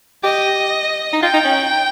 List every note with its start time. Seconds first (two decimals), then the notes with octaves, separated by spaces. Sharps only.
0.23 G4 D#5
1.13 D#4
1.22 F4 G5
1.33 D#4
1.44 C#4